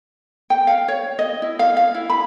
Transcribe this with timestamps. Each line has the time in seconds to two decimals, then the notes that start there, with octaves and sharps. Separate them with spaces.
0.50 G5
0.67 F5
0.88 C#5
1.19 D#5
1.42 E4
1.59 F5
1.77 F5
1.95 E4
2.10 B5